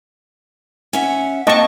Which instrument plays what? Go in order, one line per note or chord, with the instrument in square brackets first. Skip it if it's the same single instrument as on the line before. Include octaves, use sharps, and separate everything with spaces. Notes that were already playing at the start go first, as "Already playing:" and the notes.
[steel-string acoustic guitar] C#4 E5 F#5
[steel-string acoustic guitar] A#3 C4 [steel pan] D#5 A5 C#6